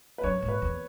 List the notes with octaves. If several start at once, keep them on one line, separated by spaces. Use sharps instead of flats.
B4
F#2 C#5
G#2
B4
E2